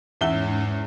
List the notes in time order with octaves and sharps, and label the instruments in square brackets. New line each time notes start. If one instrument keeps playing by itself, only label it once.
[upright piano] E2 E5 G7 [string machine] G#2 C#4